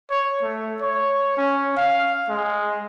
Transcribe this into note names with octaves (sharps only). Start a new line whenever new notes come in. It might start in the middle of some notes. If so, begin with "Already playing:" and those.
C#5
A3
C#5
C#4
F5
G#3